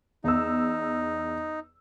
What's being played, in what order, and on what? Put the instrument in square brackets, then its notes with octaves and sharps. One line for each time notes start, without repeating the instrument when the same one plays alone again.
[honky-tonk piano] E2 E6 [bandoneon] D#4